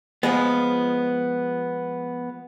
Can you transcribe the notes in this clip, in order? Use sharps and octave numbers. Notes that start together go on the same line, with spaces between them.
F3 G#3 B3